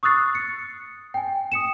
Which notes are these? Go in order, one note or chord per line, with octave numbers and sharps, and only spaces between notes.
C#6 D#6 E6 F#6 A6 C7
C#7
G5 G#5
D#6 C#7 E7